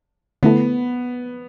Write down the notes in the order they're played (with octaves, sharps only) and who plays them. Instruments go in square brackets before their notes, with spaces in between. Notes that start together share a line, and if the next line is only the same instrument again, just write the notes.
[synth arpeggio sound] D3 A3 E4 A4 [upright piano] B3